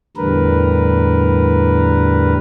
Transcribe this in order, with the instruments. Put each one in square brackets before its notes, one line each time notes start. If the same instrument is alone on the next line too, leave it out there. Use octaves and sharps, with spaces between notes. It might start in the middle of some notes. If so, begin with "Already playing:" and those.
[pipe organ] E2 A2 D3 G3 A#4 B4